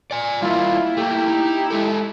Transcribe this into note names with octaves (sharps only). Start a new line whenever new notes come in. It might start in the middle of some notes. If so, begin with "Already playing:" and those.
D5 G#5
G3 A#3 E4 F4
A3 A#3 G4
D#4
G#3 A4